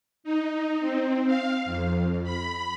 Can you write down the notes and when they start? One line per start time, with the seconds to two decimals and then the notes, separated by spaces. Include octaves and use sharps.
0.24 D#4
0.80 C4
1.26 F5
1.65 F2
2.23 B5